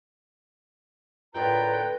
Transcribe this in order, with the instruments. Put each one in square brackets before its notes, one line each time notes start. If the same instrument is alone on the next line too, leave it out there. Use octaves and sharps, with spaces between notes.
[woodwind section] F#2 F4 A#5 [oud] A2 D3 G#3 [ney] B4 [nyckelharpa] G5